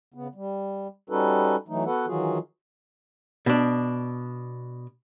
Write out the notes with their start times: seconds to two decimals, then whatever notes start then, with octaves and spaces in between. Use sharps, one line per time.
0.14 C#3 B3
0.35 G3
1.10 G3 C#4 D#4 F#4 A4 B4
1.68 E3 F#3 A3 D#4
1.85 B3 F#4 A4 B4 F#5
2.07 D#3 E3 F#3 F4 F#4 G#4
3.46 B2 D4